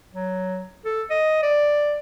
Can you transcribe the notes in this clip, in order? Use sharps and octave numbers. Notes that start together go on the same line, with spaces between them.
F#3
A4
D#5
D5